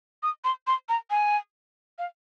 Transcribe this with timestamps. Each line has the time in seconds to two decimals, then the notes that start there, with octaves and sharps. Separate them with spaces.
0.23 D#6
0.44 C6
0.67 C6
0.89 A#5
1.11 G#5
1.99 F5